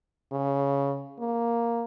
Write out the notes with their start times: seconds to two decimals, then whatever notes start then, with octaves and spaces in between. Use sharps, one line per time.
0.32 C#3
1.19 A#3